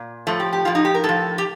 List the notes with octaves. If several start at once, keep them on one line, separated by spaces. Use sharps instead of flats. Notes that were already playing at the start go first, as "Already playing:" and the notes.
Already playing: A#2
A2 F3 A3
G4
G4
A2 F3 F4
D#4
G4
A#4
A2 A4
F3
G4